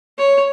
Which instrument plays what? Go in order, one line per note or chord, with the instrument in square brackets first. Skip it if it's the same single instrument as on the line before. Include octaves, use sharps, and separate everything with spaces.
[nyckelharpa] C#5